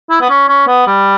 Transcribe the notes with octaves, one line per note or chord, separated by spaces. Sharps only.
E4
B3
C#4
C#4
B3
G3